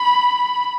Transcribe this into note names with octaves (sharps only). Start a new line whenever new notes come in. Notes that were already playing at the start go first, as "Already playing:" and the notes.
Already playing: B5